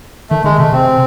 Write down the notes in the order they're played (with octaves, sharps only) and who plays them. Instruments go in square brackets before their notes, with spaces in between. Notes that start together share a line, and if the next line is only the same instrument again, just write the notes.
[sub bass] D#3 [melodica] A3
[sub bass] D#3 [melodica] G#3
[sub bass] C3 [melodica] A3
[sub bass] C3 [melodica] C4